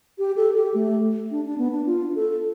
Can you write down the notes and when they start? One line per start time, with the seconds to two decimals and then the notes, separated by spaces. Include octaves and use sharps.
0.18 G4
0.36 A4
0.56 G4
0.74 A3
1.31 D4
1.45 D4
1.58 B3
1.72 D4
1.86 F4
2.15 A4